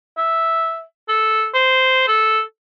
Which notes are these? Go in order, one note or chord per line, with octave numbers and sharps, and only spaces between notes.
E5
A4
C5
A4